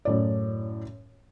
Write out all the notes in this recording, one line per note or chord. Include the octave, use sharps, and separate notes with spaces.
F#2 A2 D5